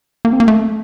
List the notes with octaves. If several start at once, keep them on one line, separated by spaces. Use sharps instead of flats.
A#3
C4
A#3
A3